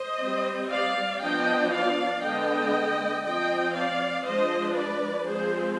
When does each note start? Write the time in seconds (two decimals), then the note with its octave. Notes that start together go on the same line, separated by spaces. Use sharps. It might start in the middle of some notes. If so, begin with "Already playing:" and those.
Already playing: C5 D#5
0.21 G3 C4
0.71 D5 F5
1.22 F3 B3 D4 D#5 G5
1.72 D5 F5
2.23 D3 G#3 B3 D#5 G5
3.24 F3 C4 D#5 G5
3.75 D5 F5
4.25 F3 G#3 D4 C5 D#5
4.76 B4 D5
5.26 F3 G#3 C4 G#4 C5